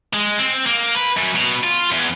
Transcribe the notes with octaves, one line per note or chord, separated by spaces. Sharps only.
G#3
C4
A#3
B4
F#2
B2
F4
E2